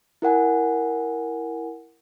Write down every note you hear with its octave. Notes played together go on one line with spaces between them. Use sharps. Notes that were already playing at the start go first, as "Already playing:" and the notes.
E4 A#4 F#5 G#5